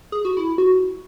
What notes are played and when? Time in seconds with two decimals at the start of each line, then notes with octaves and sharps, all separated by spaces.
0.12 G#4
0.25 F#4
0.37 E4
0.58 F#4